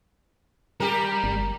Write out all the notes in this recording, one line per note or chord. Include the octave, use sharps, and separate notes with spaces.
G3 G4 A#4
G1